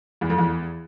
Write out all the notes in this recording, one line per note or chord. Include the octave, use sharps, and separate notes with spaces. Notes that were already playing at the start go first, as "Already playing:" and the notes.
E2
F2
E2